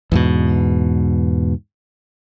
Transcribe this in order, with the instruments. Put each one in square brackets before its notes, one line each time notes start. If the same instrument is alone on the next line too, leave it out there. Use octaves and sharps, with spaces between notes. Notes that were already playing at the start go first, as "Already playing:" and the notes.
[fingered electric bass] E2 G#2 B2